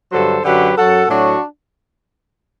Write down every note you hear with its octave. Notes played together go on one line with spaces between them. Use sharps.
G2 D3 F#3 A4 C5
F#2 D3 F#3 G4 B4
F#2 F#3 F#4 A4
A2 F#3 D4 F#4